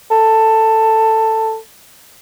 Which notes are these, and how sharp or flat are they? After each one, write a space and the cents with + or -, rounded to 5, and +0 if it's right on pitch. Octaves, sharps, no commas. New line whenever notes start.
A4 +10